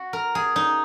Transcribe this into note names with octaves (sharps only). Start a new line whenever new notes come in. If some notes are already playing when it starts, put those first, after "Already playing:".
Already playing: F#4
A#4
G#4
D#4